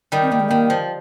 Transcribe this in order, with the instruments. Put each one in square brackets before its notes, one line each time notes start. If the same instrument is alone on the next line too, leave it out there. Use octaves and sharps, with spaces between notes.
[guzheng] D#3 G3
[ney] C4
[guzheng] D#3 [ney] A#3
[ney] G#3
[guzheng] D#3 [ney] A#3
[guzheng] F3